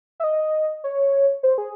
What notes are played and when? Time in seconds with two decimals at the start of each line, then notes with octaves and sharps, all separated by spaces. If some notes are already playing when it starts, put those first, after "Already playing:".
0.20 E5
0.24 D#5
0.84 C#5
1.43 C5
1.58 G#4